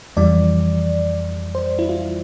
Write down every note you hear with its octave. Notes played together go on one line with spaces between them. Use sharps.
F2 E3 G3 D5
C5
E4
F4